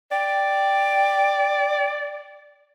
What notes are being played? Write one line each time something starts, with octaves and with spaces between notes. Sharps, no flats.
D5 G5